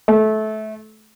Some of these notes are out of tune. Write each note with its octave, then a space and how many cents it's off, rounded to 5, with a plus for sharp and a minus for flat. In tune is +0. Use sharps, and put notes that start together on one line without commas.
A3 -25